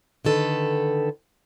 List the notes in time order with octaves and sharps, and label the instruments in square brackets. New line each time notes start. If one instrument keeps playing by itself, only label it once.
[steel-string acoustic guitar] D3 D#3 A4 B4